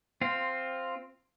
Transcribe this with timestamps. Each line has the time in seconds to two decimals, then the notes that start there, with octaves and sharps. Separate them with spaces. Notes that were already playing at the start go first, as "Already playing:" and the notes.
0.21 C4 F4